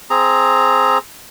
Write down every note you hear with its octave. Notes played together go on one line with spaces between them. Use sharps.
C4 G#4 A#5